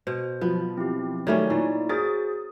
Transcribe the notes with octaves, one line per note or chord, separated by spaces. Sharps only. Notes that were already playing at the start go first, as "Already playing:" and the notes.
B2 C5
F3 F#3 B3
C4 E4 G4
D#3 F#3 G3 A3 C#4 C#5 G#5
A#2 A3 D#4 E4 D5
F#4 G#4 A#4 C5 D#6 A6